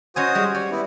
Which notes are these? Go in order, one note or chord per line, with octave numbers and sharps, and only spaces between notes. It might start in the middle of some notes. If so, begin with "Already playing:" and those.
C#4 F#4 C5 D#5 G#5 D#6
G3 G#3
C#5 D5
B3 E4